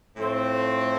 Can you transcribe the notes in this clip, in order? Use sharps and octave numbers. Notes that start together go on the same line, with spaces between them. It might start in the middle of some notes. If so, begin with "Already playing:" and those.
A2 F3 A3 C4